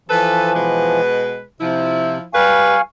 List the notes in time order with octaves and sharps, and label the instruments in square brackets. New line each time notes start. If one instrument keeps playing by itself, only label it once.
[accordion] E3 F3 [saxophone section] A4 B4
[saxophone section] B2 G#3 B4
[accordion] C3 [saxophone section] F3 E4
[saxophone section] G3 B4 [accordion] F5 G#5 C#6